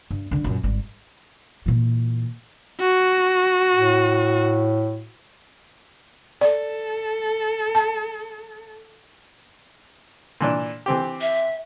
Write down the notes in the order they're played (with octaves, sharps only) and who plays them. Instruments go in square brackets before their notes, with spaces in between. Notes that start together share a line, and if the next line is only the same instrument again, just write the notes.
[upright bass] G2
D3 D4
F#2 A#2
G#1 G3
A#2 E3
[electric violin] F#4
[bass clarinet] A2
[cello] A4 [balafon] D5
[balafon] A5
[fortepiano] A#2 E3 D4
E3 C4 G4
[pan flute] E5